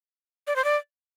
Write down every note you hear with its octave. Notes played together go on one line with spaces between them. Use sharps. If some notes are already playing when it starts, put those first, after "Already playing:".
D5
C5
D5